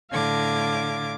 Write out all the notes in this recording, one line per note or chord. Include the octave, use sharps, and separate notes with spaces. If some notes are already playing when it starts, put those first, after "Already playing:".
A2 D3 F5 D6 G#6